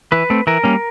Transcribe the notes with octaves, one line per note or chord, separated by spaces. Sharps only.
E3 B4
A3 C4
E3 A#4
G3 A#3 C#4